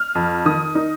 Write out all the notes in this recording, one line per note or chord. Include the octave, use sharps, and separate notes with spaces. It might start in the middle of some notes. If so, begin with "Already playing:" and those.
Already playing: F6
F2
D#3 D#6
D#4